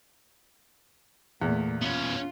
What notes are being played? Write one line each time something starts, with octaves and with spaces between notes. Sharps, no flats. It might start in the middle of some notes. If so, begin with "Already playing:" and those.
E2 A#2 A3
B3 C#4 F4